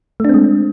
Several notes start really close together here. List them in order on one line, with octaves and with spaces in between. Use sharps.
A3 D4 C4 G#3